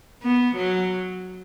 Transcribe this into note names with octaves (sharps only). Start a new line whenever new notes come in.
B3
F#3